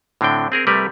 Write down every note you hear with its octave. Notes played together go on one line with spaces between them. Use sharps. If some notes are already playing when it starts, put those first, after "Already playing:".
A2 D3 C4 D4 G5
C4 G#4 A#4
C3 G3 A3 A#4 B4